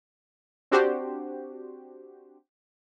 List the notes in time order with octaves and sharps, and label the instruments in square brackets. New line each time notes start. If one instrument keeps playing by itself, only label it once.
[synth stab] C4 D4 F#4 G4 C5